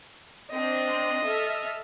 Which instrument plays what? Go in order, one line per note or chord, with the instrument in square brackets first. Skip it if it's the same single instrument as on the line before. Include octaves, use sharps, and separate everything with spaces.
[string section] C4 D4 [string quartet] D#5
[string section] A4 E5 F6